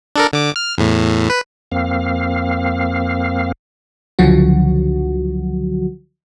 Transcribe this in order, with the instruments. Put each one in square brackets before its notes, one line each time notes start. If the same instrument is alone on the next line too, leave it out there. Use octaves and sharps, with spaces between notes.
[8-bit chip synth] D4 A4 A#4
D3 D6
F6
E2 A2
B4
[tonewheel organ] F2 A#3 C4 F5
[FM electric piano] C#2 D3 F3 F#3 F#4